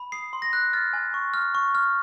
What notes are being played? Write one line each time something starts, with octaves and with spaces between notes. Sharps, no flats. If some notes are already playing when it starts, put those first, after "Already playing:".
Already playing: B5
D#6 C7
C6
A#6
F#6
F6 A6
G#5
C#6
F6
C#6
F6